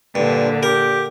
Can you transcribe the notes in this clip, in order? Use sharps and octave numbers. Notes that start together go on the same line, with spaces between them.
G2 A#2 D3
G4 A#4